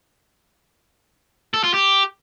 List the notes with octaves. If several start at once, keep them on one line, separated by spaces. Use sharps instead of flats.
A4
F4
G4